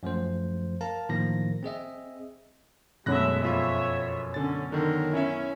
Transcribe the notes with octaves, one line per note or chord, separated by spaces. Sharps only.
F#2 F3 A3 C5
A#4 F5 A5 A#5
A2 D#3 F3 A#3 A#6
C4 G#4 D#5 E5
F#2 B2 G#3 A3 E5 B5 F#6 A#6
F2 F4 C#5 E5 B5
D3 C#4 A6
D3 D#3 A#4
C#4 E4 C#5 E5